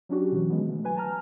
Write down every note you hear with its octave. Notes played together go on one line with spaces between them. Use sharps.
F#3 C#4 D4 F#4 G4
B2 D3 E3 F#3
D#3 G#3 B3
A3
F#3 B4 G#5
A5 A#5 F6